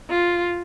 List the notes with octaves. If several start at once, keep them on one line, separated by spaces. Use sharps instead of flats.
F4